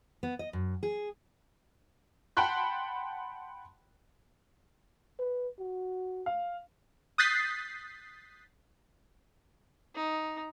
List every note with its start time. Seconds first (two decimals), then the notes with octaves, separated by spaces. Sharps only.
0.23 B3
0.39 D#5
0.53 F#2
0.83 G#4
2.37 F#5 G5 A5 B5 C6 F#6
5.19 B4
5.59 F#4
6.26 F5
7.18 D#6 F#6 G6 A6 B6 C7
9.95 D#4